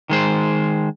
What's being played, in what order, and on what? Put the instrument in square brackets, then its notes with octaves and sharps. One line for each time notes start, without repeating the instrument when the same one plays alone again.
[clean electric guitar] D#3 G#3 C5